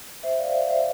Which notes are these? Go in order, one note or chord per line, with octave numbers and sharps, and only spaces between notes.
C5 E5
D5 F5
C5 E5
C5 E5